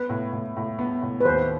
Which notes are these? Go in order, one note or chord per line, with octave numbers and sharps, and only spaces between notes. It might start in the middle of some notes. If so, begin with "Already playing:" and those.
Already playing: B3 B4
A2
A2
A2
B3
A2
B4
D#2 C5